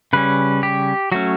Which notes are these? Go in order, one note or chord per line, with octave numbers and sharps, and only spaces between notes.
C#3 G3 C#4 B4
G4
F#3 A3 C#4 F#4